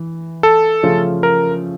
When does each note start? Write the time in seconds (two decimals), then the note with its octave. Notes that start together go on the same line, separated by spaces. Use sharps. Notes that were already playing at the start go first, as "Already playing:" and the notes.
Already playing: E3
0.43 A4
0.83 C#3 F3 A3 C#4 F4
1.23 A#4